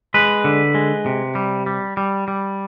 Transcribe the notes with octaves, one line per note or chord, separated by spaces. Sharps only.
G#3 B4
D3
G#3
C3
G3
G3
G3
G3